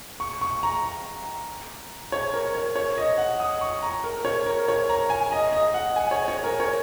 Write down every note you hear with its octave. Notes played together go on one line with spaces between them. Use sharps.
C#6
C#6
A#5
C#5
A#4
C#5
C#5
D#5
F#5
D#6
C#6
A#5
A#4
C#5
A#4
C#5
A#5
G#5
D#5
D#5
F#5
G#5
C#5
C#5
A#4
C#5